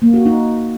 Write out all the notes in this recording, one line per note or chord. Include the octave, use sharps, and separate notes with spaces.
A#3
F#4
D#4